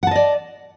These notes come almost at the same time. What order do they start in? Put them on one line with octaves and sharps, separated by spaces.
F#5 A5 D#5 D5